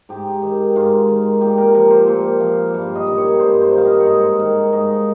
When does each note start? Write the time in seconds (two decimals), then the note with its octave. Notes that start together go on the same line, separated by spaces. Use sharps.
0.09 G#2 G4
0.42 D#3
0.76 G#2 F4
1.09 D#3
1.41 A#2 G4
1.58 A#4
1.74 F3 A#4
1.91 C5
2.08 A#2
2.40 F3 F5
2.74 G2 F5
2.95 D#5
3.07 D#3
3.18 C#5
3.39 G2 C5
3.62 C5
3.73 D#3 F5
3.85 D#5
4.00 C#5
4.06 G#2 D#5
4.39 D#3
4.73 G#2 D#5